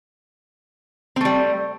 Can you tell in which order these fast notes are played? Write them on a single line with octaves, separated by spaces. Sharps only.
C4 A3 G3